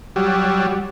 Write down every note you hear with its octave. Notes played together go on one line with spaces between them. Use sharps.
F#3 G3